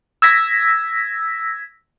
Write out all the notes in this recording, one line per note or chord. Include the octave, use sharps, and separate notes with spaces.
E6 G#6 A#6 B6